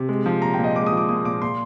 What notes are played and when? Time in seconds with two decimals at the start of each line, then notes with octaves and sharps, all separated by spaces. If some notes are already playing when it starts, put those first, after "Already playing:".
Already playing: C3
0.09 G#3
0.26 F3
0.42 A#2 A#5
0.54 A#2 G5
0.64 D#5
0.76 G#3 D6
0.86 D#6
0.92 F3 D6
1.09 A#2 D#6
1.25 A#2 D6
1.42 A#2 C6